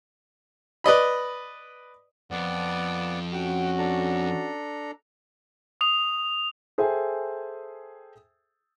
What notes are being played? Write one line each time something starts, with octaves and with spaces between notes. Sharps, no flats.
B4 D5 D#5 B5
F2 B3 D5 F#5
C#4 F#4 F#5 G5
D4 A4 A#5
D#6 F7
G#4 A4 C5 E5 G5 G#5